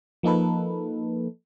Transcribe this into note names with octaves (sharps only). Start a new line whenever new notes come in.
F3 A#3 D#4 A4 B4